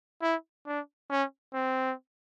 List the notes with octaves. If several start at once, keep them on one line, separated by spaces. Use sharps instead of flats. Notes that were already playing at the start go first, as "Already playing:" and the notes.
E4
D4
C#4
C4